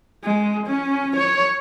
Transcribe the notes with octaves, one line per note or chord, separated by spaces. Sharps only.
G#3
C#4
C#5